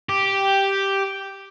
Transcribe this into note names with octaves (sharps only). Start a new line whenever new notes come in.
G4